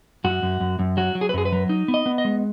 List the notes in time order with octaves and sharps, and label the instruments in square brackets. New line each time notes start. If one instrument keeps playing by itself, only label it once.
[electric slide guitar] F#2 F#4
F#2
F#2
F#2
F#3 F#4
F#3
G#4
B4
F#2 G#4
B4
F#3
D#4
B3
D#5
B3
D#5
G#3